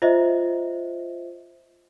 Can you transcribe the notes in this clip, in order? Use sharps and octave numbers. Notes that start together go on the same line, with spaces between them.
F4 C5 D#5 E5